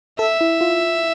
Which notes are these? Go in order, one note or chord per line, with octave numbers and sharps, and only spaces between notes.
A4 E5
E4
F4